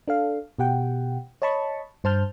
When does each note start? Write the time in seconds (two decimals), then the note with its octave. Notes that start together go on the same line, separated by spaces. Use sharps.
0.08 D4 A4 F5
0.59 B2 G4 F#5 G5
1.42 C#5 D#5 A5 B5 C#6
2.04 G2 C5 A5 F6 G6